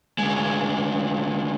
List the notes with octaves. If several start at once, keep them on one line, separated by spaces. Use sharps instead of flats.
D2 G#3